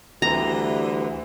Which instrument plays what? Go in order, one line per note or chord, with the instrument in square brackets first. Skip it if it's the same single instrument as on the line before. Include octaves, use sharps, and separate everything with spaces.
[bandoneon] D2 [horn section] E3 G3 G4 [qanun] A#5